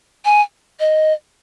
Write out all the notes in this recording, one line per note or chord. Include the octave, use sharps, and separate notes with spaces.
G#5
D#5